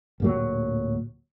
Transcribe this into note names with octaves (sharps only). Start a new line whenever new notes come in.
D1 A#2 F#3